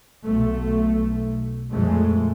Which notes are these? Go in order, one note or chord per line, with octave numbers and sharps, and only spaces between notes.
B1 A3
F2 A#2 G#3 A3